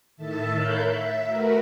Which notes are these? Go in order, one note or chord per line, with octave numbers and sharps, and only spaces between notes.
A2 D#3 A4 E5 A5
A#4 C#5 F5 B5 F#6 G6
E5
A3 F#4 A#4 B4